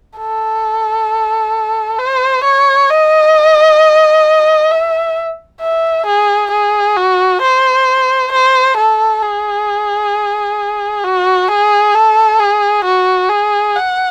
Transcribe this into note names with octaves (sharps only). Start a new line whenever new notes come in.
A4
C5
C#5
D#5
E5
E5
G#4
G#4
F#4
C5
C5
A4
G#4
F#4
G#4
A4
G#4
F#4
G#4
F#5